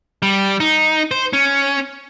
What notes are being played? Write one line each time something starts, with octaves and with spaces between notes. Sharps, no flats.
G3
D#4
C5
C#4